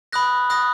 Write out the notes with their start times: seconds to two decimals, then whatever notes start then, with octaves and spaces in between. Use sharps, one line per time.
0.12 B5 D#6 F#6 A#6
0.50 B5 D#6 F#6 A#6